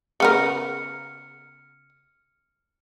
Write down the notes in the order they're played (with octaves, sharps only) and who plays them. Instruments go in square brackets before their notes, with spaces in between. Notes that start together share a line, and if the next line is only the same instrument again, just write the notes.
[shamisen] C#3 B3 A#4 [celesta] F6 C#7